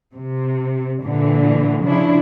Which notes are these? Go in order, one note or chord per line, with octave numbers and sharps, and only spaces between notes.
C3
A#2 D3 E3
C#3 F3 D4 E4